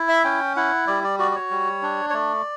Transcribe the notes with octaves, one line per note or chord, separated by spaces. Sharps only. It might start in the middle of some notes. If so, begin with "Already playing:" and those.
Already playing: E4
E5
C#4 G5
E4 F#5
G3 D5
D5
F#4 D5
D5
C#5
G3
D4
C#5
A3 D5